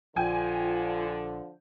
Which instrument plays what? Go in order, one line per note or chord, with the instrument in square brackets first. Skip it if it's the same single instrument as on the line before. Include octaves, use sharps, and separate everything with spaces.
[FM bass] A#1 [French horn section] D3 F3 [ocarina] F4 [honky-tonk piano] G5 G#5